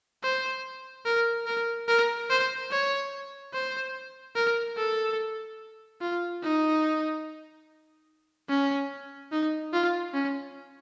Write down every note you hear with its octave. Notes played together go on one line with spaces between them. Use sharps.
C5
A#4
A#4
A#4
C5
C#5
C5
A#4
A4
F4
D#4
C#4
D#4
F4
C#4